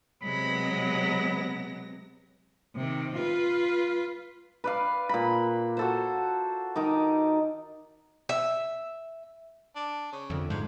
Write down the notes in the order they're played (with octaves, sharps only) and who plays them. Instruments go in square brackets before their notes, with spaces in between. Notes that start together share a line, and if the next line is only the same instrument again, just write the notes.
[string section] C3 B3 A#6 [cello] F#3 G#3 [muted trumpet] B5
[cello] C3 D#3
F4 B4
[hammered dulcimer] B4 D5 F5
A#2 B5
F#4 A4 C5
D#3 D#4 D6
[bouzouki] E5
[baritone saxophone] D4
C#3
[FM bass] F2 [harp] D3 E5
[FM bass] G#2 [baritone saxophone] F3